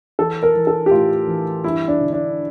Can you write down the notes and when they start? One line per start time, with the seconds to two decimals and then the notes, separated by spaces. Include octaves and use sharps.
0.19 E3 A4
0.43 A#4
0.55 E3
0.67 A4
0.86 G4
0.91 A2 F4
1.27 E3
1.64 G2 E4
1.88 D4
2.01 D3
2.13 D4